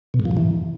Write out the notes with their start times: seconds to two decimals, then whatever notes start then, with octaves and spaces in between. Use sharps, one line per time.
0.14 B2
0.20 G#2
0.25 F3
0.31 G2
0.37 E3